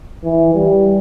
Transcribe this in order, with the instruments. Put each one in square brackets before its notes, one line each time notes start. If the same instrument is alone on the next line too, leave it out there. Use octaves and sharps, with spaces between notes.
[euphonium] E3
G3